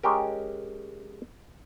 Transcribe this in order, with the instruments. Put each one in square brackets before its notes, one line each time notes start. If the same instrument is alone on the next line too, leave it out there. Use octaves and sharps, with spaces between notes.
[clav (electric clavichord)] G#3 C#4 G4 A#4